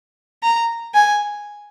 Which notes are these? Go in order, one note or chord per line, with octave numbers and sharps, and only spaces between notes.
A#5
G#5